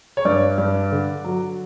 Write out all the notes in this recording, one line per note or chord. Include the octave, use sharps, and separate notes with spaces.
C#5
G2 D5
G2
D3
F#3